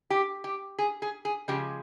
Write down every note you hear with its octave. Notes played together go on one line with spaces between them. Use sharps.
G4
G4
G#4
G#4
G#4
C#3 F3 G#3 G4